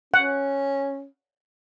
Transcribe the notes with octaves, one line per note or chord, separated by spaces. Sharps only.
C#4 F#5